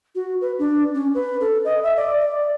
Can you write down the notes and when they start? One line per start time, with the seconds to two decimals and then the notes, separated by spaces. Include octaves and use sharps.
0.15 F#4
0.41 B4
0.59 D4
0.94 C#4
1.14 B4
1.41 A4
1.65 D#5
1.83 E5
1.96 D5
2.20 D5